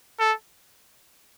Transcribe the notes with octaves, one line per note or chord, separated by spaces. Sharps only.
A4